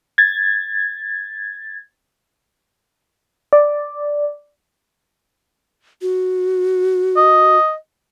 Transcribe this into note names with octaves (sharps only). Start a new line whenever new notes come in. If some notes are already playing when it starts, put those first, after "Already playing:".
G#6 A6
D5
F#4
D#5